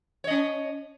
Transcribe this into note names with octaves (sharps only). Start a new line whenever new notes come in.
C#4 C#5 D#5